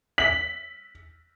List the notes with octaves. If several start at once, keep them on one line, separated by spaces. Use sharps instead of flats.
B6 F#7